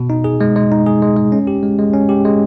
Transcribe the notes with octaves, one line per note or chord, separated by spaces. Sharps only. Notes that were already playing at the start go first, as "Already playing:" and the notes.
Already playing: B2
D#4
G#4
G#3
G#3
D#4
G#4
G#3
G#3
C#4
G4
G#3
G#3
C#4
G4
G#3